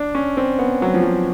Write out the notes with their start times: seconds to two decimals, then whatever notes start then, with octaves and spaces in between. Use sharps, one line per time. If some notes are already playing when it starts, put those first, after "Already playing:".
Already playing: D4
0.15 C#4
0.37 C4
0.59 B3
0.82 F#3
0.94 F3
1.03 F#3